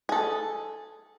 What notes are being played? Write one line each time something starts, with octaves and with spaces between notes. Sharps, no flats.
G#4 A4